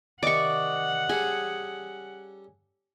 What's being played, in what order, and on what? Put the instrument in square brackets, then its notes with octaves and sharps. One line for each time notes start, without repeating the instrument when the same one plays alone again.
[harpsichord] C3 D#3 D#4 [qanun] D5 C#6 [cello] F#5
[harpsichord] G3 C#4 A4 [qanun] G#4